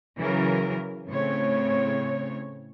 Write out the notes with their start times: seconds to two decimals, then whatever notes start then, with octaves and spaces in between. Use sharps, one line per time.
0.18 C#3 E3 F#3 A#4
1.08 A2 C#3 C4 C#5